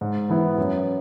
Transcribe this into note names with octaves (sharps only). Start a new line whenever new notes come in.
G#2
E3 B3 E4
F#2